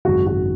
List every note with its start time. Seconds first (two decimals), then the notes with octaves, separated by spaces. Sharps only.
0.05 G#1 F#2 C#3 F#4
0.27 F#4